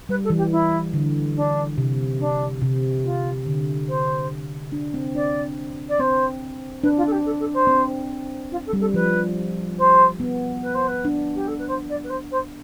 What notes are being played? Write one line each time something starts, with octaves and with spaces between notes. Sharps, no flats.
G3 B4
A4
E3
G4
E4
D3
D4
C3
D4
C3
F4
D3
C5
D4
C4
D4 D5
D5
C4 C5
D4 B4
F4
A4
G4
A4
A4
C5
C4
F4
A4
G3
A4
F3 B4
C5
B3
B4
C5
B4
D4
G4
A4
B4
C5
D5
B4
C5
C5